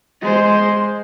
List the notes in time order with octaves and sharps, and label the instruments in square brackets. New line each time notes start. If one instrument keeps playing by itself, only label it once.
[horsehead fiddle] G#3 C5